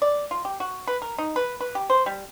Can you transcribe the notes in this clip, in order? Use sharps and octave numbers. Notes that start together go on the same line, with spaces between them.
D5
F4
G4
F#4
B4
A#4
D#4
B4
B4
G4
C5
G3